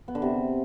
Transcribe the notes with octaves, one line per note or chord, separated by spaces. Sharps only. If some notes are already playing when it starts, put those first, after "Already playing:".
B3
D3
C3